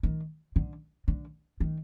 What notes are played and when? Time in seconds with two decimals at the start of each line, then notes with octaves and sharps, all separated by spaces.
0.03 D#3
0.56 D3
1.08 D3
1.60 D#3